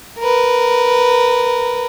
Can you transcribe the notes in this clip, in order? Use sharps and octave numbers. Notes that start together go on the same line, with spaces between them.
A#4 B4